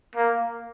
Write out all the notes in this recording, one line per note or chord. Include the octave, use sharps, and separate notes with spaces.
A#3